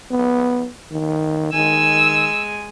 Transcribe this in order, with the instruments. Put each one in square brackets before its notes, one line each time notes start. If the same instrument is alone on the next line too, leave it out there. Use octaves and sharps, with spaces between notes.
[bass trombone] B3
D#3
[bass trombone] D#3 [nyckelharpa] G#3 G#5 [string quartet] E6